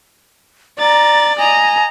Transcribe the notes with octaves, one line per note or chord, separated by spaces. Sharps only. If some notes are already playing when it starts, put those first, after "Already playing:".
D5 A#5 A6
D#5 G#5 A#5